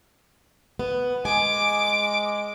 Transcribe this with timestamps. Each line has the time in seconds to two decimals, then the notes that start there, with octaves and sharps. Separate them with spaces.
0.79 B3
1.25 G#3 G#5 D6